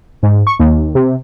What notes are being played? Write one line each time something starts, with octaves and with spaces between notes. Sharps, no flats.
G#2
C#6
D#2
C3